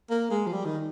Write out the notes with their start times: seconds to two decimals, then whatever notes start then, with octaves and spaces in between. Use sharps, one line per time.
0.10 A#3
0.31 G#3
0.47 F3
0.53 G3
0.66 D#3